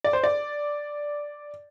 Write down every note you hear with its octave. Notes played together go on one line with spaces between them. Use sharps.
D5
C5
D5